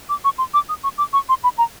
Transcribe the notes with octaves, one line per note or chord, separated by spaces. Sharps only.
D6
C#6
C6
D6
D#6
C#6
D6
C#6
C6
B5
A#5